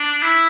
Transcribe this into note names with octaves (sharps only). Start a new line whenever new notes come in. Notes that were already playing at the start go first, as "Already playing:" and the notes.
Already playing: D4
E4